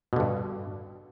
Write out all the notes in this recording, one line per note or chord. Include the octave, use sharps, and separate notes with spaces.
G2 B2 D3